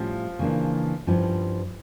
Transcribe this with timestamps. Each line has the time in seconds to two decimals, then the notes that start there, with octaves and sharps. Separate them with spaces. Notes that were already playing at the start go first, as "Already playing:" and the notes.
Already playing: A2 F3 G3 C#4 F4
0.39 C#3 E3 A#3 D4
1.07 G2 F3 C#4 E4